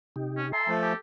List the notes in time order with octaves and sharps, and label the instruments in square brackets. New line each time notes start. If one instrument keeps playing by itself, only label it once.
[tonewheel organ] C3 D#4 G4
[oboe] C#4
[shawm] A4 [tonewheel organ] E5 G#5 A#5 [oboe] C6
[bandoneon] F3 A3
[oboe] G4 [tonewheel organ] G#5